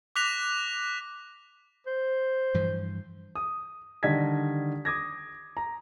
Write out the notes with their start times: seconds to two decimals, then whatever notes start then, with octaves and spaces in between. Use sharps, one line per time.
0.16 D6 F#6 A#6 B6 F7
1.87 C5
2.54 G2 E3 F3
3.35 D#6
4.03 D3 D#3 G3 D#5 G#6 B6
4.85 D6 D#6 G#6 A#6
5.57 A#5